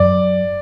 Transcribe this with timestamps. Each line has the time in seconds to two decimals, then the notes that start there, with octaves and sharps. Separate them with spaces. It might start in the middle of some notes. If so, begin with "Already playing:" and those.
Already playing: F#2 D5